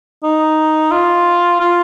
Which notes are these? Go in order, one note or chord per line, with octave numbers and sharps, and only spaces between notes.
D#4
F4
F4